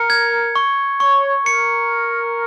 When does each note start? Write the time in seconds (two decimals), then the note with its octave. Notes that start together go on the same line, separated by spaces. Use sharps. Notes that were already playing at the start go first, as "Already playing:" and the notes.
Already playing: A#4 C#7
0.10 G#6
0.56 C#6
1.00 C#5 C#6
1.46 A#4 C#7